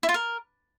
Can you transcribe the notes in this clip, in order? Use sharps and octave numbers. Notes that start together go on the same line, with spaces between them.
E4
F4
A#4